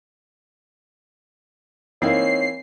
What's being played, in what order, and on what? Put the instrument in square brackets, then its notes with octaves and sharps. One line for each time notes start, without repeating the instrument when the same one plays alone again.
[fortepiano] E3 A#3 [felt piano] C4 D#4 F5 [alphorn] C#5 [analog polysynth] C7